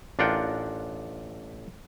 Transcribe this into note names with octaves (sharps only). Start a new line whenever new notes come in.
A1 D4 F4 A#4 F#5 G5